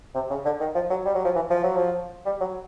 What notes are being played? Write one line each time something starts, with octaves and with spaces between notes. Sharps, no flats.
C3
C#3
D3
D#3
F3
F#3
G3
F#3
F3
E3
F3
F#3
F3
G3
F#3